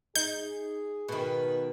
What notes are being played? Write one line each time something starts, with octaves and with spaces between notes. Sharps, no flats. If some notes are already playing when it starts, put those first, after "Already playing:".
D#4 G#4 G6
B2 D#3 B4